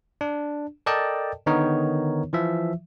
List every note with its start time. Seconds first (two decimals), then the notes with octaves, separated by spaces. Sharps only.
0.21 D4
0.86 A4 A#4 D5 D#5 G5 A5
1.46 D3 D#3 B3 D#4 A#4 C#5
2.33 E3 F3 E5